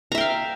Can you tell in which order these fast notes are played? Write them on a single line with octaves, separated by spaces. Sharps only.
A#5 E5 G5 F5